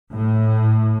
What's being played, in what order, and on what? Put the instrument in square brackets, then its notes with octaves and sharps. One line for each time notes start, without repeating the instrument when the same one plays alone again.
[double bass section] A2